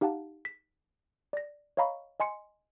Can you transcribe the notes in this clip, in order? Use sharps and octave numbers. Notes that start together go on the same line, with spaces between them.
D#4 G4 F5 F#5 A5
B6
D5 A#6
C#5 D#5 F5 A#5 B5 C#6
D#5 G#5 C6 C#7